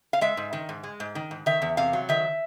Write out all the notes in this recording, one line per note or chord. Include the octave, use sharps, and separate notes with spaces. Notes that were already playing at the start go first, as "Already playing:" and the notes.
F5
G#3 E5
G#2
D#3
G#2
G#3
G#2
D#3
G#2
D#3 E5
E2
C3 F5
F#3
D#3 E5